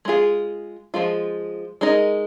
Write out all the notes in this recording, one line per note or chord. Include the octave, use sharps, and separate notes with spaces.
G#3 F4 G#4
F3 G#3 F4
G#3 D#4 A#4 D#5